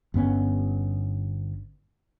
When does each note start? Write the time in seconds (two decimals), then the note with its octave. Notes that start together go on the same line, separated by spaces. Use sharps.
0.14 G1 G2 B3 C#4